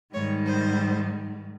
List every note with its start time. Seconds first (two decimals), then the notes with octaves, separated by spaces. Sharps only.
0.13 G#2 D#3 G3 C#5
0.45 C5